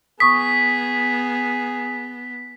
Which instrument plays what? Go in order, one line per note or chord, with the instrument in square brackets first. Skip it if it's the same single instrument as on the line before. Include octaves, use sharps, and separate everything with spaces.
[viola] B3 [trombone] G#4 [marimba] C#6 D#6 [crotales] B6